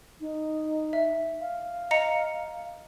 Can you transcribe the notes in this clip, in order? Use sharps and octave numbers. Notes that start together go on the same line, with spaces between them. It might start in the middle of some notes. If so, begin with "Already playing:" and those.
D#4
E5
F5
D#5 A#5 C#7